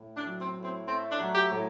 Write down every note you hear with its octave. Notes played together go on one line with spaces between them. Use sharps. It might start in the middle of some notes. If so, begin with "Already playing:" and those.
Already playing: A2
D4
F#3
C4
A2
C4
A3 C4
D4
F#3
G4
A2